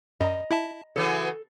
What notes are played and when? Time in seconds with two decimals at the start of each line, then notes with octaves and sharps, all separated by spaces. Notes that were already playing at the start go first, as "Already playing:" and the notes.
0.20 F#2 D#5 A#5
0.51 E4 E5 A5
0.96 C#3 E3 F#3 A4